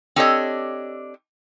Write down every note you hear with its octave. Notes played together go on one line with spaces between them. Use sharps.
C4 D4 G4 A4 C#5 D#5